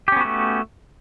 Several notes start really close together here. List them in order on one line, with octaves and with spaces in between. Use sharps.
G4 C#4 B3 F#4 A3